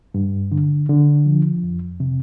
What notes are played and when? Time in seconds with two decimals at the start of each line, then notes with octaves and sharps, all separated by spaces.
0.14 G2
0.52 D3
0.89 D3
1.26 F3
1.64 F2
2.00 C3